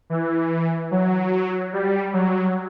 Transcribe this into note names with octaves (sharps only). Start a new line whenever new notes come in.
E3
F#3
G3
F#3